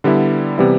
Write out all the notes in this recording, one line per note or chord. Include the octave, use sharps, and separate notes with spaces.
D3 G3 B3 E4
C3 E3 G3 B3 E4